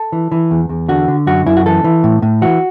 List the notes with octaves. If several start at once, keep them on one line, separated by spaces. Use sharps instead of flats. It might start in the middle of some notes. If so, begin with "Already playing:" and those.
Already playing: A4
E3
E3
E2
E2
D3 F#4
D3
F#2 F#4
F#2 E4
F#4
E3 A4
E3
A2
A2
E3 F#4